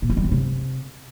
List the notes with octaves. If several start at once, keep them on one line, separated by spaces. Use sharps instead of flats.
A#2
E3
G3
F#2
C3